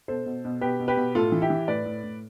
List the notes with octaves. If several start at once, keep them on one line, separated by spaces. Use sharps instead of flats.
B2 A4 C5
B2
B2
B2 G4 B4
B2
G4 B4
B2
A2 F4 A4
E3
E4 G4
E3
A2 B4 D5
A2
A2